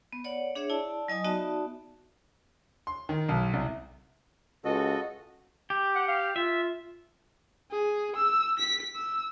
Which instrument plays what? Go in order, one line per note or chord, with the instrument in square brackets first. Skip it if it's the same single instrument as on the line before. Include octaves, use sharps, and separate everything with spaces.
[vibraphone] B3
C#5 D5 F#5
D4 G#4 C#5 E5
E4 D5 A5
F#3 D#5 G#5 D#6
B3 D#4 F#4 D5 E5 A5
[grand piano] C6
D#3
B1
C2
[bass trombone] C#2 [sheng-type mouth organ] F#4 A4 D#5
[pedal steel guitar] G4
[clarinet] F#5
F5
[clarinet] F4 [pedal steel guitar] E5
[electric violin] G#4
E6
B6
E6